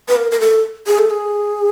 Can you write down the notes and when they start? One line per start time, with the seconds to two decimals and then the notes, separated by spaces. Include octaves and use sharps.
0.08 B4
0.16 A#4
0.32 A#4
0.40 A4
0.87 G#4
0.99 A4
1.10 G#4